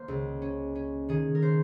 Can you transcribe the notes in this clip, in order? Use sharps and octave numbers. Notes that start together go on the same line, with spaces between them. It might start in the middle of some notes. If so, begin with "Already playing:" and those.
Already playing: A#3 C5
C#2
C#4
C#4
D#3 G#4
A#4
C5